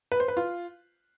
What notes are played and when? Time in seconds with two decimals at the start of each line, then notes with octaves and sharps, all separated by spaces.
0.12 B4
0.20 C5
0.28 B4
0.37 F4